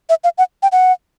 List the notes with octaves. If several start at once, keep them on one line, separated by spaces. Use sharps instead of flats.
E5
F5
F#5
G5
F#5